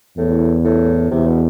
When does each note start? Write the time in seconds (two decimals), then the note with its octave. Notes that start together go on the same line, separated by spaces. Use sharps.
0.17 E2 A2
0.65 A2
1.11 E2 C3
1.27 B2